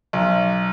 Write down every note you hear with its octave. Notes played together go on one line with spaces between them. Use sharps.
B1